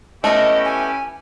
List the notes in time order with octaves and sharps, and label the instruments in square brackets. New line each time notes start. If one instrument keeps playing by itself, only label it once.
[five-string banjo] A3 B3 [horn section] C#4 E4 G4 [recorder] D#5
[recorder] G#5